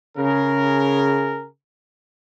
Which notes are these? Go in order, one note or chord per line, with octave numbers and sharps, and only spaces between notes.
C#3 G#4 A#4